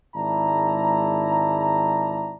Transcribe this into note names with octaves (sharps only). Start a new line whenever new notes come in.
G#1 G#3 E4 D5 A5 A#5